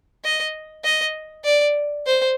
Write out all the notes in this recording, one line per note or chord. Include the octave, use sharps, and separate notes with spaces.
D#5
D#5
D5
C5